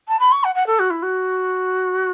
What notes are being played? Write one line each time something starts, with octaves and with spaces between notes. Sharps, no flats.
A5
B5
C#6
F#5
F#5
A4
F#4
E4
F#4